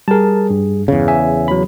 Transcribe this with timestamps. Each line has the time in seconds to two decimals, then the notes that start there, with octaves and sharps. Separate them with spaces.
0.08 G3 G#4 A#4 A5
0.50 G2
0.88 E2 C#3
1.08 E5 G#5
1.48 F#3 B5